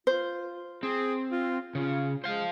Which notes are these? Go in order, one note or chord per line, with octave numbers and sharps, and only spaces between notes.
F4 C5
C4 G#4
F4
C#3 F4
G#3 C5 F5